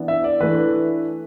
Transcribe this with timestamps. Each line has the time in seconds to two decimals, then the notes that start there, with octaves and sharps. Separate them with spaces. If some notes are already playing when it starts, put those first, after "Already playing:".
Already playing: E3 B3 D4
0.08 E5
0.24 D5
0.40 E3 A3 D4 B4